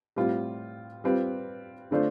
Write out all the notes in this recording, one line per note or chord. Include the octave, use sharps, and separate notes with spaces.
A2 G3 C4 F4
G3 C4 F4 B4
D3 A3 D4 F4 C5